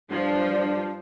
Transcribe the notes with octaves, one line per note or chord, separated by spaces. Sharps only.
G2 F3 D4